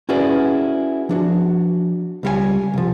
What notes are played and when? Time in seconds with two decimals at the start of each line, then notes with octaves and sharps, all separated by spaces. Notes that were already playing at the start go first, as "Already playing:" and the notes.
0.09 C#4 E4 F#4 G#4 B4 D5
1.09 F3 D4 F#4
2.23 C#2 G3 F4 G#5
2.74 C2 F3